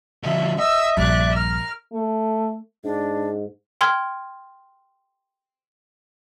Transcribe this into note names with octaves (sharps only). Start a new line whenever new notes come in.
D3 F3 E5
D#5 E5 E6
A#1 G2 D5 F#6
A#4 F6
A3
G#2 D4
G5 C6 F6 G#6